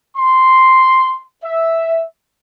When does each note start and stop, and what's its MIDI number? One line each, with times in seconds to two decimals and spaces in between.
0.17 1.22 84
1.44 2.04 76